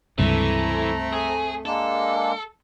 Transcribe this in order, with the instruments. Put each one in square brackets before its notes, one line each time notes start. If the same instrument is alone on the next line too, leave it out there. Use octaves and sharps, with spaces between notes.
[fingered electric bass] C#2 G2 C3 [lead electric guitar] E3 [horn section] A3 C4 [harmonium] A#5
[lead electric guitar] G#4
[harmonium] G#3 A#3 D4 [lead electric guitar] A4